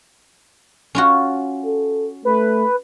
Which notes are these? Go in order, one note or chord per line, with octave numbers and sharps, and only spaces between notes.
C#4 F4 F#4
A4
A3 B4